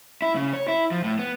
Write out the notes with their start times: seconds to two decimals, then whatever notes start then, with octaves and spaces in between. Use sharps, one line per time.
0.22 E4
0.36 C#3
0.53 C#5
0.68 E4
0.91 F3
1.04 A2
1.19 B3